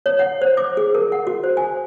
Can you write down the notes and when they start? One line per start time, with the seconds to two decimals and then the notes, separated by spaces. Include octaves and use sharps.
0.06 C#5
0.19 F#5
0.42 C5
0.57 D6
0.77 G#4
0.94 A#4
1.12 F#5
1.27 F#4
1.44 C5
1.57 G#5